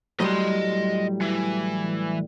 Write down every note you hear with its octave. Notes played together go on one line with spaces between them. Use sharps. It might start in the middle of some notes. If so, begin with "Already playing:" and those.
A2 F#3 G3 D#5 C6
E3